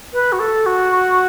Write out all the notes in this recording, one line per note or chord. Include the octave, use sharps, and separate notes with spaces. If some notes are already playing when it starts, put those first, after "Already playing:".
B4
F#4
A4
F#4